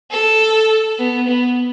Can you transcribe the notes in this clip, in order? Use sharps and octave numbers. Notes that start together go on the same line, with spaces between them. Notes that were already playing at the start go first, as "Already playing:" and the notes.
A4
B3
B3